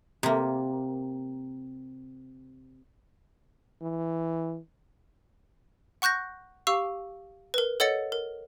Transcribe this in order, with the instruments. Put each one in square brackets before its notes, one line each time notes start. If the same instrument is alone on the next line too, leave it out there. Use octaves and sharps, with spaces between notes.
[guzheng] C3 A#3
[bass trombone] E3
[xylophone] F#5 C#6 F#6 G6 A#6
G4 F5 C#6 E6 C7
A#4 B4
A4 C#5 D#5 F#5 A6 C#7
A#4